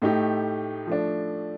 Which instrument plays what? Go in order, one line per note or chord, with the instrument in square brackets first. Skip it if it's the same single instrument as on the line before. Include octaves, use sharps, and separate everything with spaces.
[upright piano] A2 A3 D#4 G4
F3 A3 D4